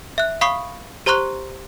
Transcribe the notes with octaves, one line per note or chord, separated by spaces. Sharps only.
E5 F#6
F5 B5 C#6 D#6 C7
G4 C5 A#5 C6 C#6 F#6